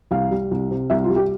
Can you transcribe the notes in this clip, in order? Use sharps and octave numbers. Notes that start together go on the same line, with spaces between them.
C2 F5
G3
C2
C3
C2 E5
F4
G3
G4